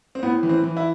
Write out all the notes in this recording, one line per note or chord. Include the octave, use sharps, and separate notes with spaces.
C4
A2 B3
E3
C4
E3
E4